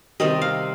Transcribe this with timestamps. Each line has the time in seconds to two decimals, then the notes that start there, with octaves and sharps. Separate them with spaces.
0.20 C3 D#3 G3 D#5
0.42 F5